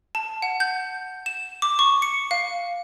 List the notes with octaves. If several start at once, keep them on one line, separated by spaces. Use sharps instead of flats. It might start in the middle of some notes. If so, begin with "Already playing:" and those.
A5
F#5
G6
E7
D6
C#6
C#7
F5